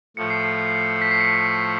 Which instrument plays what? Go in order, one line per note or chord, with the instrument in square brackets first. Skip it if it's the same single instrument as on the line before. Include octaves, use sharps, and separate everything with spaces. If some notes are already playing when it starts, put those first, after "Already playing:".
[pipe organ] A2 F3 A3 [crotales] C#7
[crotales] C7
C7
C7
C7
B6
C7
C#7